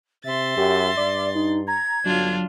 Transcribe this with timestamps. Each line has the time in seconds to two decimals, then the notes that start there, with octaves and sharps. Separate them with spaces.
0.25 C3 E5 C6 A6
0.57 F#2 G4
0.97 G2 D5
1.35 D#4
1.68 A#5 G#6
2.05 G1 F#3 D4 F4